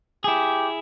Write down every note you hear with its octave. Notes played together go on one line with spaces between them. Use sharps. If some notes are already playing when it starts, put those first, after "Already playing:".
E4 G4 G#4